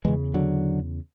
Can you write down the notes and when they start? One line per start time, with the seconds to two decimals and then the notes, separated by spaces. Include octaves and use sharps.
0.04 E2 C#3 E3 G#3
0.34 D3 F#3